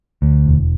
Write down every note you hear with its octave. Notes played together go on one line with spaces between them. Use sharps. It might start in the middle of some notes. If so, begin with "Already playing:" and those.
D2
E1